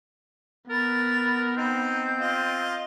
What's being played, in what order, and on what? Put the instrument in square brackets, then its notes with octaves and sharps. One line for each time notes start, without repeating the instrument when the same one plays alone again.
[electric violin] B3 [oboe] A#4 [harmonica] B5 [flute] A6
[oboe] C4 [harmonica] D#4 [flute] G6
[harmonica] F4 D#5